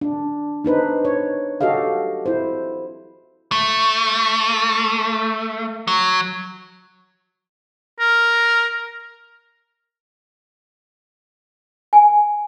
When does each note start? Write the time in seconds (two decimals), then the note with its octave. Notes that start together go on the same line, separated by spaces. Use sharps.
0.01 D4
0.64 D4 D#4 B4 C5
1.05 C#5
1.61 F#4 G4 A4 D#5 F5
2.26 E4 C5
3.52 A3
5.88 F#3
8.00 A#4
11.93 G#5